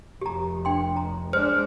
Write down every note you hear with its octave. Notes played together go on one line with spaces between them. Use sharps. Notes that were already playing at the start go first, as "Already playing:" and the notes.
F1 G4 A#5
D4 G5 C6
A#5
G#3 D4 C5 F6